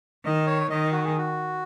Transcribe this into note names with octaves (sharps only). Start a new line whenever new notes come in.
D#3 D#5
C#5
D#3 D#5
F#4
G#4
F#4